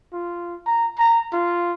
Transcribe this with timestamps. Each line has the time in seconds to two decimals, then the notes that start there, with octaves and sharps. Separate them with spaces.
0.12 F4
0.66 A#5
0.98 A#5
1.33 F4